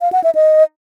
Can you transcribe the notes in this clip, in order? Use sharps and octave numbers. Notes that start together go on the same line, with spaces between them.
F5
F#5
E5
D#5